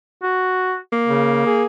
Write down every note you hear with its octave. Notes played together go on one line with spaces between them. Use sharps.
F#4
A#3
C#3
G#4